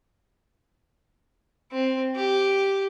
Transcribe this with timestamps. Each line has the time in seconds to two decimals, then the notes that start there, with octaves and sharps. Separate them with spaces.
1.72 C4
2.16 G4